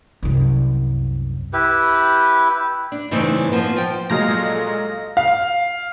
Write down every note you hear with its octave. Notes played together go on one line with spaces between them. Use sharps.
C2 F#2
E4 G4 B4
D4
G2 C#3 E3 A3 C4 D#4
F3 A#3 B3
F3 G5
A#2 F#3 G#3 D#5 F5 A#6
G3 A4
F5